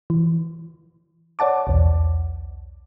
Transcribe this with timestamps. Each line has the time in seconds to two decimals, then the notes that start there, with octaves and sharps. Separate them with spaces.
0.10 E3
1.39 C#5 D5 F#5 A5 D6
1.67 B1 E2